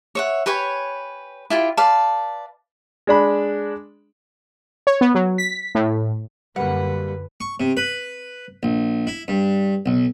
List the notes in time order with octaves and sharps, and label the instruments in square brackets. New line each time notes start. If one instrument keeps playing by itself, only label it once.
[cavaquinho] C#5 E5 F#5
G4 B4 C#5 G#5
E4 F4 G4
B4 D5 F5 A5
[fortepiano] G#3 D4 B5
[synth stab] C#5
B3
F#3
B6
A2
[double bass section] F#2 D3 [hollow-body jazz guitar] G3 A#3 [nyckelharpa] B4 [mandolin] F#5
[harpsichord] C#6
C3
B4
A#1
E4
G2
B1